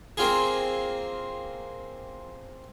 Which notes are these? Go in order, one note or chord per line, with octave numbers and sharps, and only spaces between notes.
A#3 C4 F4 G#4